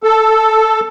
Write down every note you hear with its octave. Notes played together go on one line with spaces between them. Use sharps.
A4